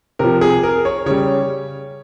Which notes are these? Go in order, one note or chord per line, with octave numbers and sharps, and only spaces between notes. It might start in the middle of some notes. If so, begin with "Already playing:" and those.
C3 F3 A#4
G#4
A#4
C#5
C#3 G3 C#5